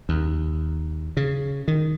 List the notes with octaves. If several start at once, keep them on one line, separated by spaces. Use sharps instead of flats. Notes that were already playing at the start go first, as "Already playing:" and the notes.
D#2
C#3
D#3